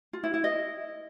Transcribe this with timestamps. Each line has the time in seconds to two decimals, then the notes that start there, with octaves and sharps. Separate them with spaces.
0.13 F4
0.24 E4
0.34 E4
0.44 D#5